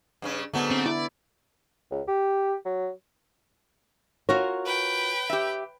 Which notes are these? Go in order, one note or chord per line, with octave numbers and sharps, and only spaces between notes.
G2 C#3 C#4
G#2 D3 F#3 A3 B3
C4
E4 D5
C#2
G4
F#3
F4 F#4 A#4 C#5
B4 G5
G4 E5